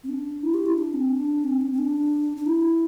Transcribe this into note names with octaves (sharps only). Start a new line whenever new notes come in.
C4
D4
E4
G4
E4
D4
C4
D4
C4
D4
C4
C4
D4
D4
E4